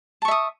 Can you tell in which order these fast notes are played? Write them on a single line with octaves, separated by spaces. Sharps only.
A5 C#6 E5 D#6